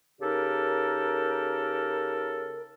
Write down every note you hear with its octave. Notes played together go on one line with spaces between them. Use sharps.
C#3 D#4 G4 A4 A#4